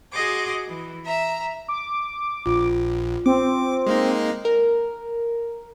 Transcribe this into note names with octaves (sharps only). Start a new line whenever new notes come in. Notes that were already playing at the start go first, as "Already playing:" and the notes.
F#4 G#4 D#5 C6 D6
E3
E5 A#5
D6
A#1 F4
C4 D6
G#3 A#3 D#4
A#4